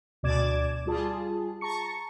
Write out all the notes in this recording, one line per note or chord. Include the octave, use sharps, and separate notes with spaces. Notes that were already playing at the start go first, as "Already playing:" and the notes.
D2 B2 D5 D6 G#6 E7
G3 F4 G#4 A5
A5 A#5 C#6 C#7